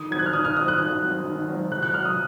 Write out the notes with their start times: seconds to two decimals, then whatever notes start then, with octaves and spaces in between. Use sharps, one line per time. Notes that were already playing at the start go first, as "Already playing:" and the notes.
Already playing: D#3 D#6
0.11 F#3 C4 G#6
0.19 F#6
0.26 F6
0.33 D#3 D#6
0.45 F6
0.56 F#3 C4 D#6
0.68 F#6
0.79 D#3
1.02 F#3 C4
1.25 D#3
1.49 F#3 C4
1.71 C3 F#6
1.83 F#6
1.94 C4 F6
1.98 F#3
2.05 D#6